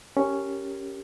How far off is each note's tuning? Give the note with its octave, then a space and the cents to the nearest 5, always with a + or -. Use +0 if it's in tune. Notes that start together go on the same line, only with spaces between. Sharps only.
C#4 +0 G4 +0 A#4 -10